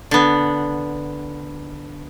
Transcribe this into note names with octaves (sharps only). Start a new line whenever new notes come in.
D3 B3